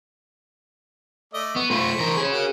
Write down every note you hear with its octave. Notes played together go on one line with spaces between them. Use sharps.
A3 D5 D#5
B3 C#6
A3 F4 C5 B5 C#6
E3 A#4
G#4 C#5
A#3 F#4